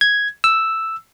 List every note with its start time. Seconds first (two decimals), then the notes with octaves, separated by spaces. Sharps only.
0.01 G#6
0.44 E6